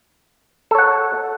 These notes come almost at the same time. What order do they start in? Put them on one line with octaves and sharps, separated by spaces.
A4 C#5 F#5